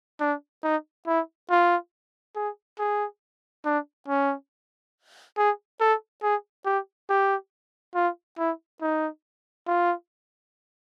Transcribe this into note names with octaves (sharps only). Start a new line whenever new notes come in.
D4
D#4
E4
F4
G#4
G#4
D4
C#4
G#4
A4
G#4
G4
G4
F4
E4
D#4
F4